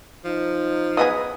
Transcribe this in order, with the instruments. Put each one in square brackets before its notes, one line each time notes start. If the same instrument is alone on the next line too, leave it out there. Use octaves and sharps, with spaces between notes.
[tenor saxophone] F3 [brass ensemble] D#4
[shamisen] F#3 B3 G#4 [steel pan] B4 D#5 D#6